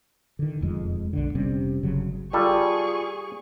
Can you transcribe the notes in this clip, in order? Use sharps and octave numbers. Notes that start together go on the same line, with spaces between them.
D3 D#3
E1 F2 G#3
B1 D3
F1 C3 G3 C#4
G1 C#3 F#3
G3 F4 G#4 A4 D5 C#6